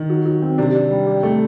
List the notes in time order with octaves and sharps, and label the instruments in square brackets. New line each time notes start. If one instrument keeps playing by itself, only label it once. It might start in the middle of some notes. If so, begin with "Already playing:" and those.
Already playing: [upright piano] D#3
[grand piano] F#3
F#3
C4
[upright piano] C3 [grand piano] D4
[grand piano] D4
G3
G4
A3